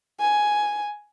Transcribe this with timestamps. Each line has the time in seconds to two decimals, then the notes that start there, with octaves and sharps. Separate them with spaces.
0.20 G#5